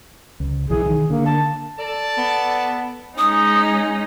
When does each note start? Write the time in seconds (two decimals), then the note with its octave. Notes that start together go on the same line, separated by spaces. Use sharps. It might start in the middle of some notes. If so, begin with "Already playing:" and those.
0.40 C#2
0.70 B1 E3 G#4
0.86 D#3
1.10 D3 A#3
1.26 A5
1.79 A4 D5 A5
2.18 B3
3.18 G#3 C#4 D#4 D#6